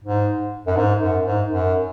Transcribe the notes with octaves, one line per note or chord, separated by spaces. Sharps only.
G#2
F#2
G#2
F#2
G#2
F#2